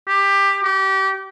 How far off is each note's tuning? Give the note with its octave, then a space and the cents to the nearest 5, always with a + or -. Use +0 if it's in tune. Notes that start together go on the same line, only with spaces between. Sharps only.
G4 +15
G4 -30